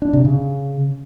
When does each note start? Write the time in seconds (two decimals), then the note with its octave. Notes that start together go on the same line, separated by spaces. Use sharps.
0.02 D4
0.13 C3
0.25 C#3